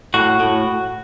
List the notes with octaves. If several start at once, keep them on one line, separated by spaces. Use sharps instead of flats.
A2 F#4
A2